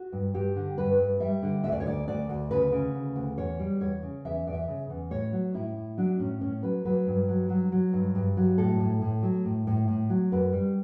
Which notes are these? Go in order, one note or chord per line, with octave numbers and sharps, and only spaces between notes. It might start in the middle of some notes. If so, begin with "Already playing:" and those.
Already playing: F#4
G2
G2 G4
D3
G2 B4
G2
G3 E5
D3
D2 E5
D5
C#5
D2 D5
D2 D5
D2
C#3 B4
C#3
D2
D2
E2 C#5
G3
E2 C#5
C#3
E2 E5
E2 D5
E5
C#3
E2
A2 C#5
F#3
A2 E4
A2
F#3 D4
A2 C#4
A2 C#4
F#3 B4
F#3 B4
G2
F#3
F#3
F#3
G2
G2
F#3
A2 A4
A2
A2
F#3
A2
A2
A2
F#3
F#2 B4
G3